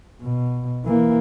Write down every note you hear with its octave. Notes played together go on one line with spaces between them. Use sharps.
B2
E3 A#3